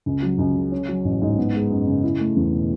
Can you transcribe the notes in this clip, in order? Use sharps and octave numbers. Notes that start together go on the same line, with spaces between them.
C#2
F#3
C#2
C#3
C#4
F#3
A1
G#2
B3
G#3
F#2
C#3
E4
A3
E2
B2